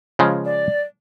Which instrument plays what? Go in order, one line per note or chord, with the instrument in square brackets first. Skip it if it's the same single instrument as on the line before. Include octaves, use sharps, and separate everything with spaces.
[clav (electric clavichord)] C#3 F3 G#3
[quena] D5